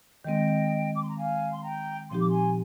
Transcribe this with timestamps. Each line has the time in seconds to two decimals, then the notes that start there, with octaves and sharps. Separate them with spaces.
0.25 D#3 G#3 C4 D#5 G5
0.95 D6
1.02 C6
1.10 A#5
1.18 F5 G#5
1.53 C6
1.64 G5 A#5
2.11 A#2 F3 C4 D#4 G4 C6
2.20 D6
2.30 G#5 C6